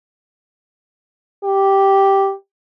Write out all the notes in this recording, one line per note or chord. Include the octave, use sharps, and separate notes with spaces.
G4